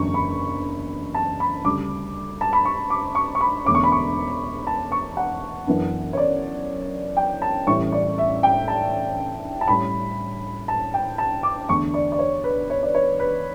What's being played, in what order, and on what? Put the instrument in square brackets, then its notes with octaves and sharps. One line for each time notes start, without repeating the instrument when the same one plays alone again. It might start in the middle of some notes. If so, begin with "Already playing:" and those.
Already playing: [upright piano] F#1 E2 D3 F#3 B3 C#6
B5
A5
B5
D2 C#3 G3 D4 D6
A5
B5
C#6
D6
C#6
C#6
B5
E1 E2 D3 A3 C#4 D6
C#6
B5
C#6
A5
C#6
F#5
F#2 E3 B3 D4
C#5
D5
G5
A5
A1 A2 E3 G3 C#4 C#6
D5
E5
G5
A5
A5
A2 G3 C#4 B5
A5
G5
A5
D6
E2 D3 A3 C#6
D5
D5
C#5
B4
C#5
D5
C#5
B4